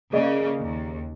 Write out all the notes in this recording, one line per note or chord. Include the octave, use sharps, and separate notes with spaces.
C#3 A#3 G#4 D5 D#5
D#2